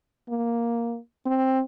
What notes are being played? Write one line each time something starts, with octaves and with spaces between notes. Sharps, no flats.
A#3
C4